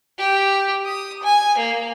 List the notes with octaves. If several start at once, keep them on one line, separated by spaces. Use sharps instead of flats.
G4
D#6
G#5
A#3